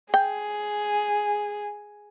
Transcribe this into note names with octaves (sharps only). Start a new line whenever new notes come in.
G#4 G5